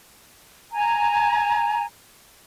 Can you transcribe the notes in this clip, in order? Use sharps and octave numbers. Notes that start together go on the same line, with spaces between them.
G#5 A#5